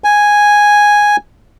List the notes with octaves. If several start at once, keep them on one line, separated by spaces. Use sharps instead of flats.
G#5